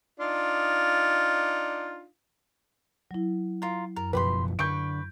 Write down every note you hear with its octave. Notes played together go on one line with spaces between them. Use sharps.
D4 D#4 F4
F#3 E4
F4 A#4
F#2 A#4
F#1 B2 F3 G4 B4 B5 C6
D3 B4 C#6 G6 D7